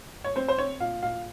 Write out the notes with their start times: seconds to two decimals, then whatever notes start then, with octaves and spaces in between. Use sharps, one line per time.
0.24 C#5
0.36 C4 C5
0.48 C5
0.58 C4 C#5
0.80 A#2 F5
1.03 A#2 F5